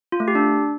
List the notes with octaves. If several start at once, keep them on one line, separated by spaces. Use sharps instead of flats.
F4
A3
G4
D4